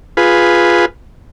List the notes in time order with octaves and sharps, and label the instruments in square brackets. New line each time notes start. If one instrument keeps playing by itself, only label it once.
[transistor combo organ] F4 G#4 B4